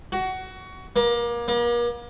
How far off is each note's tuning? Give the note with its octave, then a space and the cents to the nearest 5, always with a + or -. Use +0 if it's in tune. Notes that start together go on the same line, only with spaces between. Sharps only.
F#4 +20
A#3 +30
A#3 +40